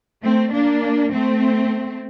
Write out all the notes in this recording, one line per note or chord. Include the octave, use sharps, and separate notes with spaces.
A3 C4
A#3 D4
A3 C4